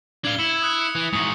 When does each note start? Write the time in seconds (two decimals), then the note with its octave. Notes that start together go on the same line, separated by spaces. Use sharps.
0.25 D4 F5 G#6 G7
0.39 E4 C#7
0.62 D#6 F#6 C#7
0.78 F#6 C#7
0.96 E3
1.13 G#2 F#4 D#6